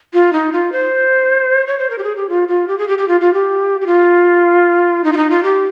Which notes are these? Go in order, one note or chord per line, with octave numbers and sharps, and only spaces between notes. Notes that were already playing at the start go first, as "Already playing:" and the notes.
F4
D#4
F4
C5
C#5
C5
A#4
G4
G#4
G4
F4
F4
G4
G#4
G4
G4
F4
F4
G4
G4
F4
D#4
F4
D#4
F4
G4